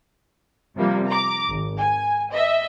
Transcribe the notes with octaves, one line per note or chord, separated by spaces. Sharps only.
C3 F3 G3 A#3
A#5 D6
G#1
G#5
D#5 E5